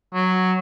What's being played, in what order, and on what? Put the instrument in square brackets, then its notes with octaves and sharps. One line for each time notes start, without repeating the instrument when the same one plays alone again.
[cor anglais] F#3